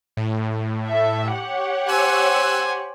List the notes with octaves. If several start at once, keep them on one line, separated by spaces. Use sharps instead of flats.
A2
A4 E5
G4 C#5 F#5
C5 G#5 E6 F#6